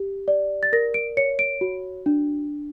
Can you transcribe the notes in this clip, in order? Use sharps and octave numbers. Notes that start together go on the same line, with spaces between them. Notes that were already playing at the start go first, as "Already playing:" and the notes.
Already playing: G4
D5
A6
A#4 A#6
D7
C#5 C#7
D7
F#4
D4